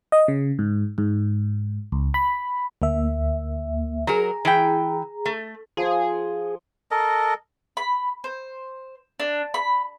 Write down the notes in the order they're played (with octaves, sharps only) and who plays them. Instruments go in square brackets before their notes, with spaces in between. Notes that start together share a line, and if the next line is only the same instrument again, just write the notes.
[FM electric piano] D#5
C#3
G#2
G#2
C#2
B5
D2 A#3 E5
[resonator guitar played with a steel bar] F#3 A#4 [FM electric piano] G#4 A#5
[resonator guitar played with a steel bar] E3 E4 G5
A3
[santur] F3 C5 [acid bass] G#4
[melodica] A4 A#4 D#5
[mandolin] B5
C5
D4
B5